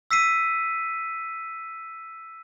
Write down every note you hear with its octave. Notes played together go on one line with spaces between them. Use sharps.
E6 B6 C7 D#7